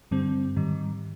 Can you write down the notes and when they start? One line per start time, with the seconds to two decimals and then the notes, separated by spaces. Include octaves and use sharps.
0.11 G2 D3 G3 C4
0.56 G#2 D#3 G3